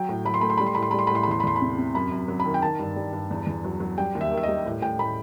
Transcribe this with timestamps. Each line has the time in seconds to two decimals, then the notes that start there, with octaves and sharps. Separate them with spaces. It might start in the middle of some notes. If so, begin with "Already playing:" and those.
Already playing: F#3 G5
0.09 A2
0.25 F#3 B5
0.34 C6
0.41 A3 B5
0.50 C6
0.57 G3 B5
0.66 C6
0.75 A2 B5
0.82 C6
0.91 G3 B5
0.99 C6
1.07 A2 B5
1.15 C6
1.23 B5
1.27 E2 C6
1.40 B5
1.43 E2 C6
1.56 B5
1.61 C3
1.78 C3
1.95 F#2 B5
2.11 F#2
2.28 F#3
2.40 B5
2.45 D#3
2.54 G5
2.62 D#3 A5
2.79 G2
2.96 G3
3.13 G2
3.31 E2
3.46 E2
3.64 F#3
3.80 F#3
3.98 G3 G5
4.15 D#2
4.21 E5
4.32 D#3
4.38 E5
4.43 D#5
4.48 G3
4.66 A2
4.82 A2 G5
4.99 A2 B5